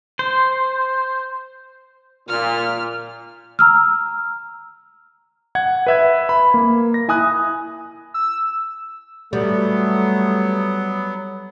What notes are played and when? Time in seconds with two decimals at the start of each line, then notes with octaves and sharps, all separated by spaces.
0.19 C5
2.29 A#2 F6
3.59 A#5 E6 F6
5.55 F#5 G#6
5.87 B4 E5 G#6
6.29 B5
6.54 A#3
6.94 A#6
7.08 E4 G#5 D#6 F#6
8.14 E6
9.33 F#3 G3 A3 B3